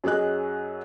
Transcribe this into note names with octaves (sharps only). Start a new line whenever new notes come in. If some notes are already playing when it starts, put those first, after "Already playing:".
F#2 F#3 G#4 D#5 F#6